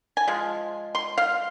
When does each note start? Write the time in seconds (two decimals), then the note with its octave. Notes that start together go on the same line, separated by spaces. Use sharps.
0.17 G#5
0.28 F3 G#3
0.95 C6
1.18 F5